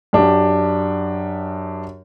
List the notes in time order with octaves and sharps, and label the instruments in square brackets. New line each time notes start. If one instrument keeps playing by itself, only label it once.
[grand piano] F#2 D4 G4